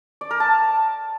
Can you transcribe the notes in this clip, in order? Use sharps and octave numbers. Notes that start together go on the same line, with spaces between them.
D5
A#4
A5